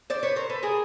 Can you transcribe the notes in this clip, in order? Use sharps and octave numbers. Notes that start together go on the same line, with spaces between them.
C5 D5
B4 C#5
A#4 C5
A4 B4
G#4 A#4